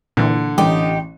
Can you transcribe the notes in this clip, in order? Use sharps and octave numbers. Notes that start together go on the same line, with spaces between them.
A#2 D3 E3
A1 D#4 G4